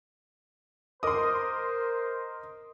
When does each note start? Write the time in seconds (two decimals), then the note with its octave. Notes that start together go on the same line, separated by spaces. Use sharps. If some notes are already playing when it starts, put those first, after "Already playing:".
1.03 A#4 C5 D#5 C6 D6 D#6